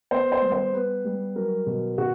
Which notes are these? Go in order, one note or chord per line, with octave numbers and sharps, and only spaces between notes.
B3 C5
C5
G3
C5
B3 B4
G3
F#3 A#4
B2
B2 F#4